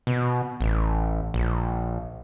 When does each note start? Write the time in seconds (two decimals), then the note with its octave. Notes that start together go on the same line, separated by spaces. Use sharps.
0.07 B2
0.61 A1
1.34 A#1